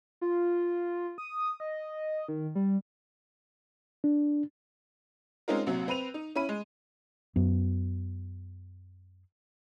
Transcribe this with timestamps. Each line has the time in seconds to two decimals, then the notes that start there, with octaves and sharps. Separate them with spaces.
0.21 F4
1.18 D#6
1.60 D#5
2.29 D#3
2.55 G3
4.04 D4
5.48 G#3 C4 C#4 D#4 F4 A#4
5.66 A#1 C3 F#3
5.88 C4 B4 D#7 F7
6.14 D#4
6.35 C#4 E4 B5 D#7
6.49 G#3
7.36 F#2 F#3 B3